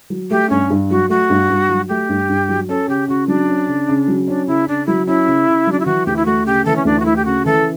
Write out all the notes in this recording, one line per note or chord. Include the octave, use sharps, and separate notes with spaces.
F#3
A3 G4
G2 C#4
G2
F#3 F#4
A3 F#4
G2
G2
F#3
A3 G4
G2
G2
F#3
C#4 A4
C#3 G4
C#3 F#4
F#3 D4
C#4
C#3
C#3
F#3
C#4 D4
C#3 E4
C#3 D4
F#3 E4
C#4 E4
C#3
C#3
F#3 D4
E4
E3 F#4
D2 G4
E4
A3 F#4
C#3 G4
E3 A4
C#4
D2 D4
F#4
A3 E4
G4
C#3 F#4
E3 A4